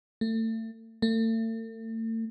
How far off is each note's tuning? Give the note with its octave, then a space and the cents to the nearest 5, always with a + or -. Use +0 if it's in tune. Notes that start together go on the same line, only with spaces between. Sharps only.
A3 +30
A3 +40